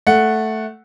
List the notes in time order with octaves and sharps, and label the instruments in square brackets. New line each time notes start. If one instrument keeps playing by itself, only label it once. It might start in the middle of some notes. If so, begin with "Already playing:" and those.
[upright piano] A3 F#5